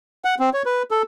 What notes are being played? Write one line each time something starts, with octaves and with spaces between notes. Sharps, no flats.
F#5
C4
C#5
B4
A4